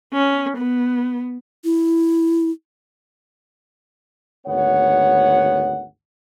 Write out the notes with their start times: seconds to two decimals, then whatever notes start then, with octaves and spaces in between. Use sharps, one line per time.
0.13 C#4
0.57 B3
1.64 E4
4.47 G#1 D2 B3 C#5 F#5